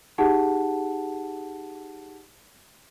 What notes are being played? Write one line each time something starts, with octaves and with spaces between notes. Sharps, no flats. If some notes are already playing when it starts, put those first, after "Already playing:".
D#4 G4 G#4 F#5 A5